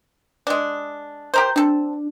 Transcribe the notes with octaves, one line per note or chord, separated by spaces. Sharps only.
G#3 D4
G4 A#4 C5 G6
C4 D4 A4